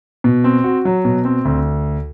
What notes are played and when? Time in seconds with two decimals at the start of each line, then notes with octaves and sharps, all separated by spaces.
0.24 B2
0.44 C4
0.64 F#4
0.85 F#3
1.05 B2
1.25 C4
1.45 D2